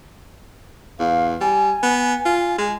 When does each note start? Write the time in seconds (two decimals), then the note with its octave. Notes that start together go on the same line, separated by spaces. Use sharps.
0.99 E2 F5
1.41 G3 G#5
1.83 B3
2.25 F4
2.58 G#3